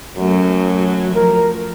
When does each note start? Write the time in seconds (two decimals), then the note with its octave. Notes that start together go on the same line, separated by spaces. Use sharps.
0.17 F#2 F#3 A3
1.14 F3 A#4